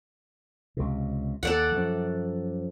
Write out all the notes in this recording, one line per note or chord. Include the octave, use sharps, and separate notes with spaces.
C#2 C3
D#2 A4 D5 F#5
F#2 F3